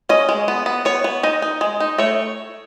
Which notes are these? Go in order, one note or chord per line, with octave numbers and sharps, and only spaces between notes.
C#4 D#5
G#3
B3
B3
B3 C#5
B3
D#4 D#5
D#4
G#3
D#4
A3 C#5